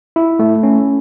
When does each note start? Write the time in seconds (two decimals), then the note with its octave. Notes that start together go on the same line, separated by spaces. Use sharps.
0.16 E4
0.39 A3
0.63 C#4